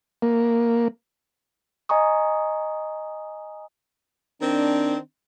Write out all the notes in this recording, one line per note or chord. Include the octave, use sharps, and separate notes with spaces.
A#3
D#5 G#5 A#5 C#6 D#6
D#3 C4 D4